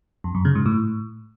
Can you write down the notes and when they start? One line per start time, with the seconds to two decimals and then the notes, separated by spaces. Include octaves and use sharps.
0.24 F2
0.35 F#2
0.45 C#3
0.55 G#2
0.66 A2